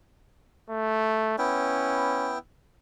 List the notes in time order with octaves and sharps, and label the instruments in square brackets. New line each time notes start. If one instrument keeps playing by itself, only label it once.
[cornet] A3
[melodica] B3 E4 G5 [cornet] C#4